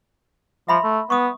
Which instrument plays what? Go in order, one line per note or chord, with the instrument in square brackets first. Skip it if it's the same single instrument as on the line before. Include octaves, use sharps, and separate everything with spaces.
[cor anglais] F3 [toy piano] E5 B5 C6
[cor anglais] A3
[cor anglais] B3 [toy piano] C#6 D#6